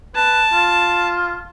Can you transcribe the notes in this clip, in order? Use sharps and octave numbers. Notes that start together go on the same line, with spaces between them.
B4 A5
F4